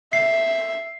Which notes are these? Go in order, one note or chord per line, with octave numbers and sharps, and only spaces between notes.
E5 C7